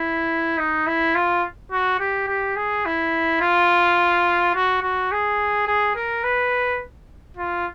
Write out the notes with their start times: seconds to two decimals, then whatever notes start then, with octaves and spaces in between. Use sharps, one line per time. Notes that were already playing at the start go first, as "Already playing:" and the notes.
Already playing: E4
0.58 D#4
0.87 E4
1.15 F4
1.72 F#4
2.00 G4
2.28 G4
2.56 G#4
2.85 E4
3.41 F4
4.55 F#4
4.82 F#4
5.12 G#4
5.67 G#4
5.96 A#4
6.24 B4
7.37 F4